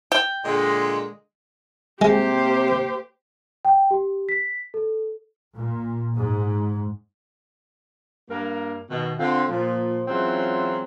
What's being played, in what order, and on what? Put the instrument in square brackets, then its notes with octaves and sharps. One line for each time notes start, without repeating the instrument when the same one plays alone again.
[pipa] G5
[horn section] A#2 D3 G#3
[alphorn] C3 [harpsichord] G#3 [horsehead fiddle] A#3 C5 [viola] G4
[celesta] G5
G4
B6
A4
[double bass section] A#2
G#2
[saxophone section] G2 A#3 A#4
B2 D#3
D3 C4 F4
A#2 F3
E3 F#3 G#3 C4 C#4 F4